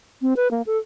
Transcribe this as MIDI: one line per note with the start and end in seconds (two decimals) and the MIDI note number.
0.22 0.33 60
0.36 0.48 71
0.51 0.62 58
0.66 0.77 69